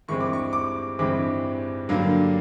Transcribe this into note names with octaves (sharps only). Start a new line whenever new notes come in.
G2 E3 G#3 C4 C#6
D6
C#6
D6
G2 E3 G#3 C4 D6
G2 D3 F#3 A#3